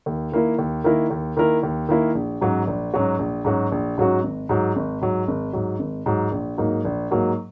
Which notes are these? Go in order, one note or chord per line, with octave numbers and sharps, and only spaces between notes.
D#2
D#3 A#3 E4 A#4
D#2
D#3 A#3 E4 A#4
D#2
D#3 A#3 E4 A#4
D#2
D#3 A#3 E4 A#4
A#1
G#2 F#3 C#4 F#4
A#1
G#2 F#3 C#4 F#4
A#1
G#2 F#3 C#4 F#4
A#1
G#2 F#3 C#4 F#4
G#1
G#2 F#3
G#1
G#2 F#3
G#1
G#2 F#3
G#1
G#2 F#3
A#1
G#2 F#3 A#3 D#4
A#1
G#2 F#3 A#3 D#4